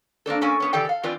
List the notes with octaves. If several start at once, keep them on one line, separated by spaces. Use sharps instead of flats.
A#3 C4 D4 A4
A#3 C#4 A4 G#5
A3 B3 C#4
C#3 E3 G4 A4 D5 G5
A4 F5
E3 C4 F4 B4 D5